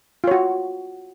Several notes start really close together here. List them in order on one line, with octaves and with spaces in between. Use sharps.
F4 C#5 F#4